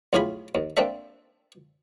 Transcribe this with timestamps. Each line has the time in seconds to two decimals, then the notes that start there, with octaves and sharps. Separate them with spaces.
0.13 B1 A2 F4 G#4 G#5 B5
0.55 D#2
0.77 A#3 C4 D4 A4 E5